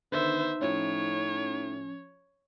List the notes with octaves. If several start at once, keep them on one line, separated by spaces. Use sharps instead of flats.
D3 D#3 B3 D#4 C5 E5
A2 F3 C#4 C#5